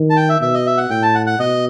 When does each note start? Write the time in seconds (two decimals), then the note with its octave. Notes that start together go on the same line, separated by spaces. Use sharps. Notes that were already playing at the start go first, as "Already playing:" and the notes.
Already playing: D#3
0.10 A5
0.16 G5
0.29 E5
0.41 B2 E5
0.54 D#5
0.66 E5
0.77 F#5
0.90 A2 G5
1.02 A5
1.15 F#5
1.26 F#5
1.39 B2 D#5